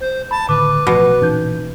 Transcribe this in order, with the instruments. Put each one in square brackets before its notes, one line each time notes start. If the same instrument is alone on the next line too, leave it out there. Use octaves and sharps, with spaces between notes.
[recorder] C5
[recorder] A5 [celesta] B5
[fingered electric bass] A2 D3 D#3 [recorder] B4 [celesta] D6
[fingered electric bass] A1 F3 [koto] B2
[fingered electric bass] A#2 E3 C#4 [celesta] D#4 G6